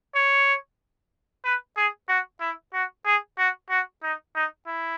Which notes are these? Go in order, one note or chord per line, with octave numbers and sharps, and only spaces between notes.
C#5
B4
G#4
F#4
E4
F#4
G#4
F#4
F#4
D#4
D#4
E4